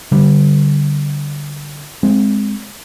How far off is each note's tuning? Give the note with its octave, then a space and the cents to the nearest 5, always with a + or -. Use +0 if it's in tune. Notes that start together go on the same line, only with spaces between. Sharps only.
D3 -10 G3 -15
G#3 +0 C4 +0